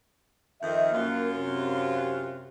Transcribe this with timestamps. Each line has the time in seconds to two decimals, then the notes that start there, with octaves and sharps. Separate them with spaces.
0.62 F2 D#3 D#5 E5
0.93 F#2 A#3 F4
1.36 C3